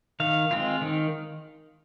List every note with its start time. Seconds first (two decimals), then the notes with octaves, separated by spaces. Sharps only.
0.20 D#3 F5
0.51 G#3 C4 F4
0.82 D#3